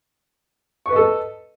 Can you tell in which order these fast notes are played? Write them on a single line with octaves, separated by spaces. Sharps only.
C#6 B4 D#5 A4